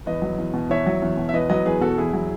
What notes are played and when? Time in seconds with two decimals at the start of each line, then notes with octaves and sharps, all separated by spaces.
0.06 E2 B4 D#5
0.22 F#3
0.38 E2
0.54 B2
0.70 E2 C#5 E5
0.86 F#3
1.02 E2
1.17 B2
1.29 E5
1.33 E2 B4 D#5
1.50 F#3 B4 D#5
1.65 E2 G#4 B4
1.81 B2 F#4 A4
1.98 E2 E4 G#4
2.13 F#3